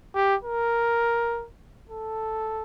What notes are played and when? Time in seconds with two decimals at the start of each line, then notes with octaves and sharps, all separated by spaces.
0.15 G4
0.44 A#4
1.89 A4